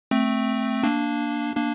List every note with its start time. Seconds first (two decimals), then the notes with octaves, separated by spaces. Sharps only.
0.11 A3 C4
0.83 A#3 D4
1.56 A#3 D4